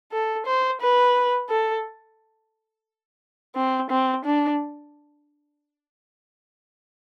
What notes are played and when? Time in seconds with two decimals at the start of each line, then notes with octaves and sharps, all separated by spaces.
0.12 A4
0.46 C5
0.81 B4
1.50 A4
3.56 C4
3.90 C4
4.24 D4